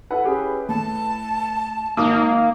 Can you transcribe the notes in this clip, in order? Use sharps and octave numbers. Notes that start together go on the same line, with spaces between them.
E4 A4 B4 F#5
C#4 G4 G#4
A2 A5
G#1 A#3 D6 D#6